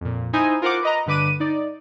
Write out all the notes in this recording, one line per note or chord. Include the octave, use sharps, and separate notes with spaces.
F2 A#2
D#4 E4 C5 G#5 D#6
F4 A#4 C5 F#5 D6
B4 D#5 A#5
G2 D3 B4 D6 D#7
D#4 D5